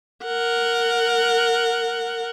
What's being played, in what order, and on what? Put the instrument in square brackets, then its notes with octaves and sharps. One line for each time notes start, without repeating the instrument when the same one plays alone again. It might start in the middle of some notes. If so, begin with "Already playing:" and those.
[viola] A#4 F#5